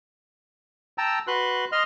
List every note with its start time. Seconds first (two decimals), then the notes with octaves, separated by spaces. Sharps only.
0.98 G5 A5 A#5 E6
1.27 F#4 B4 C6 F#6
1.72 D#5 C6 F6